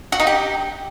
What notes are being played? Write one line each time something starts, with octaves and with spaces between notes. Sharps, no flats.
F#4
D#4
G4